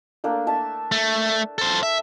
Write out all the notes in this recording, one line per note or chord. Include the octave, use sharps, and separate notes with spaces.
A3 A#3 D4
E5 A5
A3
A4 C5
E5